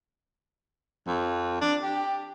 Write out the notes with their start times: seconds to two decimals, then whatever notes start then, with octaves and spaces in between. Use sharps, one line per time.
1.07 F2
1.61 D4
1.83 G4